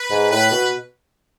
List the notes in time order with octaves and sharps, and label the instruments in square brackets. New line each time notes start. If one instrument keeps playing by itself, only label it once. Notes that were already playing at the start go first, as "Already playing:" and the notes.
Already playing: [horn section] B4
[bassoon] G#2
[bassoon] A2 [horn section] B4
[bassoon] B2